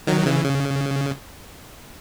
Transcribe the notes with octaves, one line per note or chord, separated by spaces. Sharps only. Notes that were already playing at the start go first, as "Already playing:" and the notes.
D#3 F#3
C#3 E3
C#3